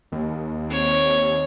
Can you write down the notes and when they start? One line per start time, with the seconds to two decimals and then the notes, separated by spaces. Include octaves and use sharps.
0.12 D#2
0.68 C4 C#5